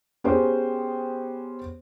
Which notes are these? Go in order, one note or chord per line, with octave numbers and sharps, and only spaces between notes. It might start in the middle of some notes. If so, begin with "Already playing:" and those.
B3 C#4 G4 G#4 C5